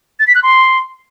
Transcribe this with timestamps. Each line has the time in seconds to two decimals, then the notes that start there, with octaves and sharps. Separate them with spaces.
0.20 A6
0.27 B6
0.35 F#6
0.43 C6